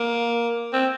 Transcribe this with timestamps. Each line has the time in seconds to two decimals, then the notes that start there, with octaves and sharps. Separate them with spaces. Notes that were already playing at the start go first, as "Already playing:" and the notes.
Already playing: A#3
0.73 C4